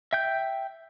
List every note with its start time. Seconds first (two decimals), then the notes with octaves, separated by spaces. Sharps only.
0.13 E5 G5 G6